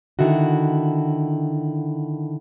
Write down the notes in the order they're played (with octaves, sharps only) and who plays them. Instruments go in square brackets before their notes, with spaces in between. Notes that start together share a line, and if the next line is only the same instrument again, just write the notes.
[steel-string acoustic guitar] D3 D#3 E4 F#4